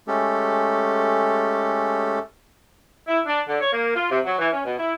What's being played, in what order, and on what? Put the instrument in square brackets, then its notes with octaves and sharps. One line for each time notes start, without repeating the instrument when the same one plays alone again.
[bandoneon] G#3 A3 C#4 G4 A4
[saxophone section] E4
D4
D3
C#5
A#3
F4
C3
F#3
E3
C#4
B2
E4